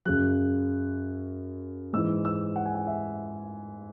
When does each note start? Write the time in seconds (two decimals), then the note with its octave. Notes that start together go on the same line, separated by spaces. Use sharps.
0.05 F#2 C#3 F#3 F#6
1.93 G#2 E3 E6
2.25 E6
2.56 F#5
2.66 G#5
2.75 F#5
2.87 E5